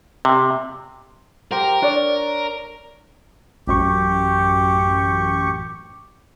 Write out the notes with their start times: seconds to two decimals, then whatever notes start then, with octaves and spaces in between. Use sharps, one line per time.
0.25 C3
1.51 G4 A#4 C5 G5
1.82 D4 C#5 D5
3.67 A1 F#2 G4 C#6